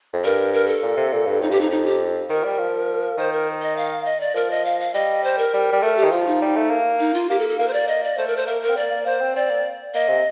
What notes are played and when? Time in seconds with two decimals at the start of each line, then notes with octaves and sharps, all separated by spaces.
0.13 F2
0.24 G2 A#4
0.54 A#4
0.67 A4
0.83 A#2
0.97 C3
1.12 A#2
1.26 G2
1.41 F2 D#4
1.50 G2 G4
1.58 F2 D#4
1.71 D#4
1.85 G4
2.29 D#3 A#4
2.44 G3
2.59 F3
3.18 D#3 C5
3.33 A#4
3.62 D#5
3.77 F5
4.05 D#5
4.20 D5
4.35 F3 A#4
4.51 D#5
4.65 F5
4.80 F5
4.94 G3 D#5
5.24 C5
5.38 A#4
5.53 G3
5.73 G3
5.83 A3 A#4
5.97 G4
6.04 D#3
6.11 F3 F4
6.27 D#4
6.42 G3
6.56 A3
6.70 A#3
7.00 D#4
7.14 F4
7.30 A#3 G4
7.39 A4
7.49 A4
7.59 A#3 A#4
7.68 C5
7.73 D5
7.88 D#5
8.03 D5
8.18 A3 C5
8.28 A#4
8.37 C5
8.47 A#3 A#4
8.62 A#4
8.70 C4
8.77 A#3 D5
8.91 A#3
9.06 A#3 C5
9.21 C4
9.35 C4 D5
9.50 A#3
9.94 A#3 D#5
10.09 C3